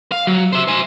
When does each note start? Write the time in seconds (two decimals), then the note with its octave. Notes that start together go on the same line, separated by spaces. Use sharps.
0.12 F5
0.27 F#3
0.53 C5 E5
0.68 C5 G#5